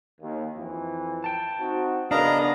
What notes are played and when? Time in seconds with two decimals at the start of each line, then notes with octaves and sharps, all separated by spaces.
0.22 D#2
0.57 F2 E3
1.24 G5 A5
1.60 C4 D#4 F#4
2.11 C#3 B3 D4 A#4 D#5 F5 A#5